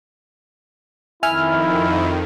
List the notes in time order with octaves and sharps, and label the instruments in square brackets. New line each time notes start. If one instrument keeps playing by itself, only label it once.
[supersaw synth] F2 D#3 [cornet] E4 [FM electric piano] E5 G#5 F6